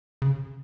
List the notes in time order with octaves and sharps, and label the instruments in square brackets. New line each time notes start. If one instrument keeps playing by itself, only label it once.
[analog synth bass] C#3